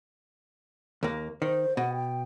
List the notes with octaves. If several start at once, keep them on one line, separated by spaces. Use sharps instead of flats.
D#2 A#3
D#3 C5
B2 F#5
G5